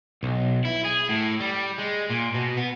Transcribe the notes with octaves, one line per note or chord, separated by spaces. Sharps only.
B1
E4
G#4
A2
G3
G#3
A#2
B2
B3